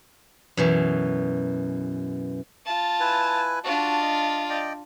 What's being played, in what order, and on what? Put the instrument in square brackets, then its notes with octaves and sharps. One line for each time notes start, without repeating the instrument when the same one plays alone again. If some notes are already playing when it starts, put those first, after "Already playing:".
[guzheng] F#2 B2 E3
[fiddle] F4 A5
[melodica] E4 B4 G#5
[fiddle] D4 F4 [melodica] F#4 A5
[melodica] D#5
D5 D#5 G5